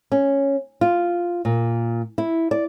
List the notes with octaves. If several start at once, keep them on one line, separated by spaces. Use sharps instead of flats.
C#4
F4
A#2
E4
D5